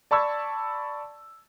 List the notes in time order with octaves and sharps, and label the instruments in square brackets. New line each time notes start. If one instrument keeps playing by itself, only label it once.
[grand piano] D5 A5 B5 C#6 E6 G#6